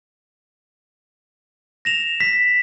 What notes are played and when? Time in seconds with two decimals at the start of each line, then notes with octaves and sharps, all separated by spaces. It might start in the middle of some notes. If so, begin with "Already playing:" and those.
1.85 A#6 E7 F7
2.20 B6